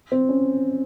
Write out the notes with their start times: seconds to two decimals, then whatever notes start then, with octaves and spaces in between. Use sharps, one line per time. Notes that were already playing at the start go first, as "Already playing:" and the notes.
0.12 C4
0.29 C#4